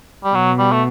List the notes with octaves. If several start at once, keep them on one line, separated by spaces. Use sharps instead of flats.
G3
B2 F#3
G3
A3